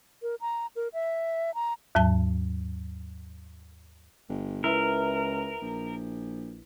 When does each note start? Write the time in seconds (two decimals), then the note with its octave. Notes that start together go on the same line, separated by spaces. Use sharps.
0.22 A#4
0.41 A#5
0.76 A#4
0.93 E5
1.54 A#5
1.95 D#2 G#2 F#3 A5
4.29 G1
4.64 C#2 E4 A#4 B4
5.62 A#1